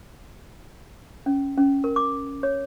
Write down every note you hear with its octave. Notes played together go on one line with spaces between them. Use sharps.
C#4
C#4
A#4
D6
C#5